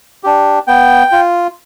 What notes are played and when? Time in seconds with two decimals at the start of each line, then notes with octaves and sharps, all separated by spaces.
0.23 D4 G4
0.67 B3 G5
1.12 F4